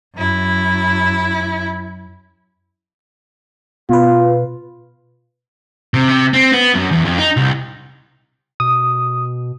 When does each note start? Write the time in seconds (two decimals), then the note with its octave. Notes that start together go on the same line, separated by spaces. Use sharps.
0.16 F#2 E4
3.89 B2 F4 B4
5.94 C3
6.09 C3
6.34 C4
6.52 B3
6.74 F#2
6.91 E2
7.05 F2
7.19 D#4
7.37 C2
8.60 B2 D#6